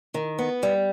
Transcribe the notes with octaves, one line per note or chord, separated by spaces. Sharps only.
D#3
B3
G3